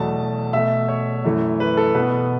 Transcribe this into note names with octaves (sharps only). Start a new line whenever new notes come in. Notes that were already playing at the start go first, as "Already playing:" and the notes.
Already playing: E2 B2 F#3 A3 A5
B2 A3 E5
C#5
F#2 E3 A3
B4
A4
B2 B3 B4